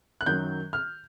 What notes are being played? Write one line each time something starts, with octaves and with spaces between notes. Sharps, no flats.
F#6
F#2 D#3 F#3 G6
F6